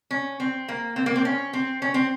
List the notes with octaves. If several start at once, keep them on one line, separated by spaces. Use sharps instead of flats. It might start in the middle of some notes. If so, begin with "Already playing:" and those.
C#4
C4
A#3
C4
A#3
C4
C#4
C4
C#4
C4